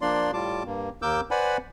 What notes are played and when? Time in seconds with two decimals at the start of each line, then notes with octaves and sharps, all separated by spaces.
0.01 F3 A#3 D4 D5 C6
0.34 A2 G3 F4 A5 D6
0.66 G2 A#3
1.02 D#2 A#3 A#4 D6 E6 G6
1.31 B4 C5 D5 F#5 G#5 B5